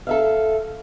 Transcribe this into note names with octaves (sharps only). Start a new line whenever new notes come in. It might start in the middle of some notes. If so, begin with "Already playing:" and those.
A4 E5 F5